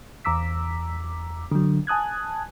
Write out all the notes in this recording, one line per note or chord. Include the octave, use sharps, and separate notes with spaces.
E2 A#5 D6 E6 B6
D3 F#3
G#5 A5 D#6 F#6 G#6